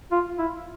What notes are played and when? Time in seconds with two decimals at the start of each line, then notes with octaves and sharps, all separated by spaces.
0.12 F4
0.38 E4